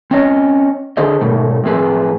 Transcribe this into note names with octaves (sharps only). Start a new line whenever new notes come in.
C4 C#4 C#5 D#5
D3 G#4 C5 D#5
G#2 B2 A3 D#4
A2 F3 C4 G#4 B4